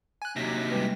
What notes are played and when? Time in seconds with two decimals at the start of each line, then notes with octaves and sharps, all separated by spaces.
0.22 G#5 F#6
0.36 D#2 C3 F#3 A#6 B6
0.71 G3 G#3 B4